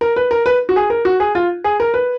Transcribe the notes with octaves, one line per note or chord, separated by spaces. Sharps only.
A#4
B4
A#4
B4
F#4
G#4
A#4
F#4
G#4
F4
G#4
A#4
B4